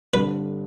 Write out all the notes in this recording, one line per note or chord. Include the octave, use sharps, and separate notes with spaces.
G1 G2 D3 G3 C4 B4